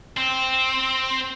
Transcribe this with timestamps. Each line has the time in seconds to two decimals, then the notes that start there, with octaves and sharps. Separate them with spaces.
0.17 C4